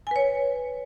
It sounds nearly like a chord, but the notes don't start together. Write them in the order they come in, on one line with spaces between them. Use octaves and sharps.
G#5 B4 C#5